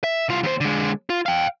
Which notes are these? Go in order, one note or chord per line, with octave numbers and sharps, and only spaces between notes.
E5
C2 F4
D#2 C5
D3 G#3
F4
F5 G5